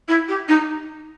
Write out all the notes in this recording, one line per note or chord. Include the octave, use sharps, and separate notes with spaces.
E4
G4
D#4